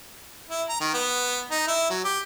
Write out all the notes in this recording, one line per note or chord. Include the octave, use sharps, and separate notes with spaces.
E4
A#5
D#3
B3
D#4
E4
F#3
G4